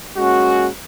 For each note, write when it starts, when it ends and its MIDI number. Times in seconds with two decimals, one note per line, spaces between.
0.17 0.68 56
0.17 0.68 58
0.17 0.68 61
0.17 0.68 66